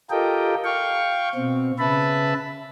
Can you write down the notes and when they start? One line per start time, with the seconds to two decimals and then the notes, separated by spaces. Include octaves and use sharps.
0.10 F4 G4 A4 A#4 D#5 G5
0.64 F5 G5 C#6
1.35 B2 C4
1.79 C#3 B4 E5 A5 B5